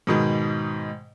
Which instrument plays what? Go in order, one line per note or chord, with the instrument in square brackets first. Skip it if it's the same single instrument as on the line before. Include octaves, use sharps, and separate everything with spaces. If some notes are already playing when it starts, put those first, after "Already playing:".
[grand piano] G#2 B2 D#3